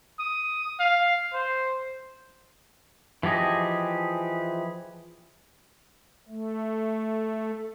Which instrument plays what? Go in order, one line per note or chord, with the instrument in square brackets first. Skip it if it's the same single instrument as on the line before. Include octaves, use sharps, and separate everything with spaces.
[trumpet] D#6
F5
C5
[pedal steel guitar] E3 F3 G4 G#4 D#5
[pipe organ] A3